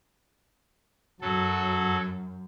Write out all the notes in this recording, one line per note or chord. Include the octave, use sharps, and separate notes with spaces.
F#2 F#3 A4